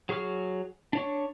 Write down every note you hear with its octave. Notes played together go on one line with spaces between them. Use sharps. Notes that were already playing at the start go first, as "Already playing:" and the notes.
F#3 G#4 C#6 F6
D4 C#5 C#6